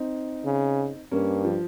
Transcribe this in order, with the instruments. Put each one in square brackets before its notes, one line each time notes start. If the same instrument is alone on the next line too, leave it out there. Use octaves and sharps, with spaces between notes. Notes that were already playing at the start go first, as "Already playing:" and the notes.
Already playing: [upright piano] C4 D#4
[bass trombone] C#3
[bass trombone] G2 [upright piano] A#3 C#4
[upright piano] F3